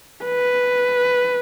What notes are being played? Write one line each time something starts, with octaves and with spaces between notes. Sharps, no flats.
B4